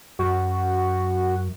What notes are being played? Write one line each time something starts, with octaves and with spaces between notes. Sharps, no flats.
F#2 F#4